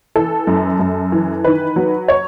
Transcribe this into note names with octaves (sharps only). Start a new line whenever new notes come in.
E3 A4
F#2
F#2
E3
D#3 B4
F#3
C#5